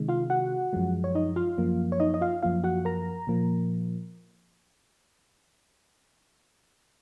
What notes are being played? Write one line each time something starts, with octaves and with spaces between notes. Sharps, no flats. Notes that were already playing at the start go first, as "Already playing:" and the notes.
Already playing: C3 D#3 G#3
F4 F5
F#4 F#5
F#2 F3 G#3
C#5
D#4 D#5
F4 F5
F#2 F3 A#3
C#5
D#4 D#5
D#5
F4 F5
F#2 F3 A#3 F4 F5
F#4 F#5
A#4 A#5
A#2 F3 A#3